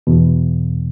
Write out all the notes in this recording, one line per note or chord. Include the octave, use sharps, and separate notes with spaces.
E2 B2